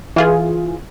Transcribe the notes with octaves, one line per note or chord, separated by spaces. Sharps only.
E3 F4 G#4